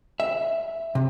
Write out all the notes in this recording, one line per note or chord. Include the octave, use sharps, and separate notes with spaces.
E5
C3